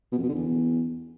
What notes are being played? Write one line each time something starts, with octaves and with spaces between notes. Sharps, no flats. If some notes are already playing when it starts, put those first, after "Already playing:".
B2
F2
B2
D3
E2